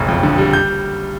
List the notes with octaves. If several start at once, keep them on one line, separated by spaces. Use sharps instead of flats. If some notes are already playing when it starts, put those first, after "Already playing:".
Already playing: F#1 B1
F2
D3
G3
G6